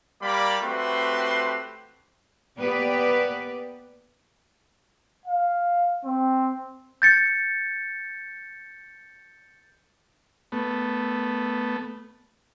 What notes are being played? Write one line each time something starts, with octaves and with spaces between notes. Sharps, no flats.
G3 A#3 A#4 D5 B5
A3 C4 F#4 G4 B4 C6
A#3 B3 G4 B4 D5
F5
C4
G6 A6 C#7
A3 B3